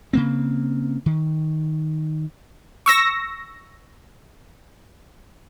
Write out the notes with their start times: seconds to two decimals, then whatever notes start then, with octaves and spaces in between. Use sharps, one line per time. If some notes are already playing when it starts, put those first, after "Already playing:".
0.13 C#3 A#3 C4
1.06 D#3
2.86 C#6 E6 A#6